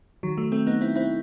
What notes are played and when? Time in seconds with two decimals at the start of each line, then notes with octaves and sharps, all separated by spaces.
0.23 D#3 F#3
0.37 F#3 A3
0.52 A3 C4
0.67 B3 D#4
0.81 C4 E4
0.96 C4 E4